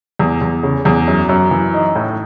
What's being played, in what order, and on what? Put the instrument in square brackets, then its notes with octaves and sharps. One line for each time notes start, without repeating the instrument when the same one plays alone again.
[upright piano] E2
E2
C#3
E2
F#2
F#2
E3
D#4
A2